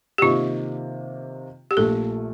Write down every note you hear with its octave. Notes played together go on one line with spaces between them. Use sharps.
G4
C3 D#3 A#3 F4
G4
A#1 A#2 A3 A4